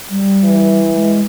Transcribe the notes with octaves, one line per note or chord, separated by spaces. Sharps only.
G3
E3
G#3